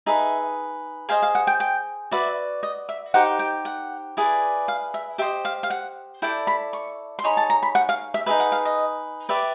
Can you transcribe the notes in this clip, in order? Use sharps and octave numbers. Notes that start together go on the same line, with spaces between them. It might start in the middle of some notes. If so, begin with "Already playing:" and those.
D#4 G#4 B4 E5
G#4 C5 D#5 F5
F5
F#5
G5
G5
F#4 B4 D5 E5
D#5
E5
D#4 G4 C5 F#5
G5
F#5
E4 G#4 B4 D5
F5
E5
G4 C5 D#5 E5
F5
F5
F#5
E4 A4 D5 G5
B5
C#6
C6
D#4 G#4 C#5 B5
A5
A#5
B5
F#5
F5
E5
D#4 G#4 B4 E5
F#5
F5
D#5
G4 B4 D5 E5